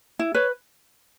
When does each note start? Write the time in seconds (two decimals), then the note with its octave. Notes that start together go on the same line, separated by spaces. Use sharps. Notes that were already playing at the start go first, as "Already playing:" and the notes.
0.19 E4
0.34 B4 C#5